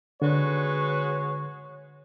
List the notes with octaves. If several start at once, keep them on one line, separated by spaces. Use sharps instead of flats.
D3 G#3 F#4 B4 C#5